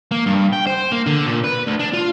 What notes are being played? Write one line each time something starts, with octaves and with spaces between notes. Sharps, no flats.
A#3
G2
G5
C5
A#3
D3
A#2
B4
D2
D4
F4